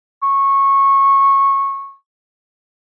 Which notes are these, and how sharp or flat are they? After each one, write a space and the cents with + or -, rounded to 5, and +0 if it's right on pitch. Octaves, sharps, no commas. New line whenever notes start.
C#6 -15